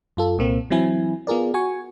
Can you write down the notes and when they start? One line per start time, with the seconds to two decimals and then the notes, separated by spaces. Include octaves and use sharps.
0.17 F#2 F4 A4
0.38 C2 A#2 A#3 C4
0.70 E3 F#3 C4 E4 G#5
1.27 B3 F4 G#4 A#4 D5
1.54 F#4 G#5 C#6